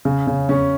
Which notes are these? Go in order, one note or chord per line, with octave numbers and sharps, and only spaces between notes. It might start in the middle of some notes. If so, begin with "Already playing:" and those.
C#3
C#3
C#3 C#4